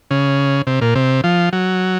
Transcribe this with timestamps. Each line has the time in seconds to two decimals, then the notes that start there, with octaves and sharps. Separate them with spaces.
0.11 C#3
0.67 C3
0.81 A#2
0.95 C3
1.24 F3
1.53 F#3